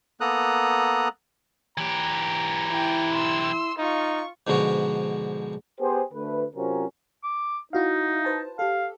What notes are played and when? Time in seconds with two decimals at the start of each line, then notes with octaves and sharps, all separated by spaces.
0.21 A#3 B3 A4 A#5 D#6 F#6
1.78 E3 G4 A#5
2.71 E4 G5
3.12 C6 E6
3.78 D#4 F4 C#6
4.47 G#2 B2 D3 F3 F#4
5.79 B3 G4 G#4 C5
6.13 D2 A3 B4
6.55 C3 F#3 C4 C#4 F4 A#4
7.24 D6
7.73 D#4 E4 F#4 F5
8.25 B4 C5 A5
8.59 G4 A4 F5